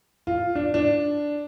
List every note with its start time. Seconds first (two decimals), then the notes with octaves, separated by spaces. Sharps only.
0.27 F4
0.55 D4
0.74 D4